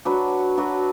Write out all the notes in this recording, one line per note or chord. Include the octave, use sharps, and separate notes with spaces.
F#3 D4 F#4 B4
F#3 D4 F#4 B4